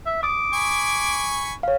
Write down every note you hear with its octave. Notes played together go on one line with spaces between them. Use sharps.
E5
D6 D#6
G#5 B5 C#6
C#5 F5